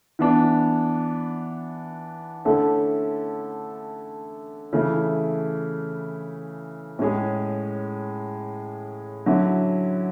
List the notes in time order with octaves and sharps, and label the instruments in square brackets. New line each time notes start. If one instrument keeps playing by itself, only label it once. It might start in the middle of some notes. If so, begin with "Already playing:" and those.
[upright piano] E3 B3 D4
D3 A3 C#4 E4 A4
C#3 E3 A3 E4
A2 G#3 C#4 G#4
D3 F#3 C#4 E4